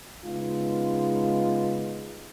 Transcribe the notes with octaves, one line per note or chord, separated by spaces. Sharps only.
C#3 G#3 B3 D#4 F4